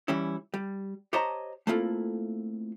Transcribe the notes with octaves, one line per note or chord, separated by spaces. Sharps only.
E3 G3 C#4 E4
G3
G4 C5 C#5 D#5 A5 A#5
A3 A#3 C4 E4 F4 A4